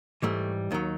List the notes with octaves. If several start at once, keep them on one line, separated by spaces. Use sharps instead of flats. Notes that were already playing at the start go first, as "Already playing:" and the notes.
G#2 E3 G3 A3
D#2 D#3 F#3